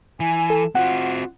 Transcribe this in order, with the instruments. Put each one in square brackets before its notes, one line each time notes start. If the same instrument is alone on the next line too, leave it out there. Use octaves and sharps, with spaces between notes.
[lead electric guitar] E3 [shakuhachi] G#5
[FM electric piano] A4
[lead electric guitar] C4 F#4 [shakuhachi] F4 [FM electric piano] F#5